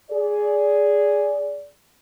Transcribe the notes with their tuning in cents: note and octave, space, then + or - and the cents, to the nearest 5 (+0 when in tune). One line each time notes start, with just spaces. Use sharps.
G#4 +0 D5 -20